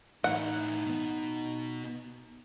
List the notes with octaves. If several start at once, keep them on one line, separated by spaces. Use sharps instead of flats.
A2 E3 D#4 F#5
B2 B3